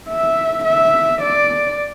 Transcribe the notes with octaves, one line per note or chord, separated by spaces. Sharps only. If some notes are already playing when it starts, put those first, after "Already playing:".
E5
E5
D5